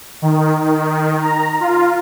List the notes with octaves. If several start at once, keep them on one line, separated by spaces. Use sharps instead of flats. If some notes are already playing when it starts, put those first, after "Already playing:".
D#3
D#3
A#5
F4